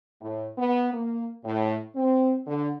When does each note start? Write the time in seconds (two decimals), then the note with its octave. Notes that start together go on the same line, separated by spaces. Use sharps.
0.21 A2
0.57 B3
0.94 A#3
1.45 A2
1.95 C4
2.47 D3